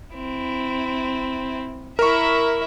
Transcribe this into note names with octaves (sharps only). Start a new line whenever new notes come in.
C4 E4
E4 A#4 E5 C#6